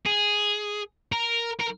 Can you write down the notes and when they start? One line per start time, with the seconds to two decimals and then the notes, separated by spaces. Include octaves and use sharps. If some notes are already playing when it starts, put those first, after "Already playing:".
0.06 G#4
1.12 A#4
1.60 A#4